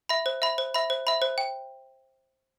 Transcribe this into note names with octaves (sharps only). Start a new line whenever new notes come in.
E5 B5
C5
E5 B5
C5
E5 B5
C5
E5 B5
C5
G5